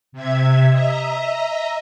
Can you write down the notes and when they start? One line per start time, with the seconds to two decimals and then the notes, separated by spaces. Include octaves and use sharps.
0.12 C3 E5 G#6
0.70 D#5 E5 A#5